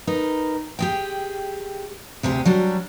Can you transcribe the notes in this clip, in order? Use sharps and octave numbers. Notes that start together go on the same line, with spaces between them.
D#4 A#4 B4
G4 G#4 G5
D2 C3 G4 G#4
F#3 G3 D4